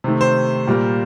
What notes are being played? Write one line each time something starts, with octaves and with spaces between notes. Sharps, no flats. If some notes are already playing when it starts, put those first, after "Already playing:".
C3 D#3 A3
C5
A#2 G3 A#3